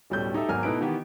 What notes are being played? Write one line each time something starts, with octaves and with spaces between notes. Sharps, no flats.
D1 B2 G3 C#4 A4 G6
D#4 G4 A4 E5
G#1 E2 F#3 A#4 G#5 F6
B2 A3 D#4 E4 B4 D7
D#3 E3 B3 G4